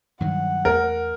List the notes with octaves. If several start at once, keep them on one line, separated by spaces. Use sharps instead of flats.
G2 D#3 F#3 F#5
E2 A3 A#4